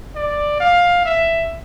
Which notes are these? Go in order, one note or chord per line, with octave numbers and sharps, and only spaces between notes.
D5
F5
E5